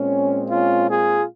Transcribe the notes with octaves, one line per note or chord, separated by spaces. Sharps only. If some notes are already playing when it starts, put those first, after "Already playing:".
Already playing: A#2 G#3 C4 C#4
C#4 F4
F4 G#4